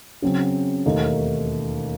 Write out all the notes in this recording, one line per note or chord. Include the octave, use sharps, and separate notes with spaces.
C#3 F#3 C4
E1 D#2 D#3 A3 D#4